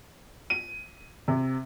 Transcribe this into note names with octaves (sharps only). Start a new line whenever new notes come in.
D#7
C3